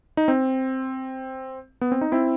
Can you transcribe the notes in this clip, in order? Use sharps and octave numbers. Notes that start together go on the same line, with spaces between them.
D#4
C4
B3
C4
D#4
C4 E4